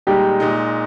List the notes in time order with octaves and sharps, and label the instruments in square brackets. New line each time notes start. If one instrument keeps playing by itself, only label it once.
[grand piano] A#2 G#3 D#4 [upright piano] G3 G4
[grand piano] A#2 G#3 D#4